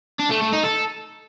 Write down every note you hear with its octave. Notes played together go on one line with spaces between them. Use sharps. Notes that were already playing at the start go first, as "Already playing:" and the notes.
D4
A3
A3
D#4
A4